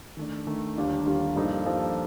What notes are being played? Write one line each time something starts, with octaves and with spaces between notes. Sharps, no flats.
D#3 A3 D4
D#3 A3 D4
D#2 D3 G3 D4 F4
D#2 D3 G3 D4 F4
G2 F3 A#3 D#4 A4
G2 F3 A#3 D#4 A4